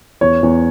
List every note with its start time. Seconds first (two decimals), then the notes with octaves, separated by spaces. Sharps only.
0.21 E2 C#5
0.43 E2